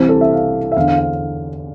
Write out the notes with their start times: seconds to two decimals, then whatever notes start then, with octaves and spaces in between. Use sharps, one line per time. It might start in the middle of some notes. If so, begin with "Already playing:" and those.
Already playing: C2 C3 E3 C5
0.09 A4
0.21 E5
0.31 F5
0.72 E5
0.76 E2 D3 F5
0.88 F5
0.98 F5